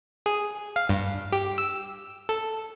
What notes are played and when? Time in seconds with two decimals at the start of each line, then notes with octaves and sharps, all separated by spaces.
0.26 G#4
0.76 F5
0.89 G2
1.32 G4
1.58 E6
2.29 A4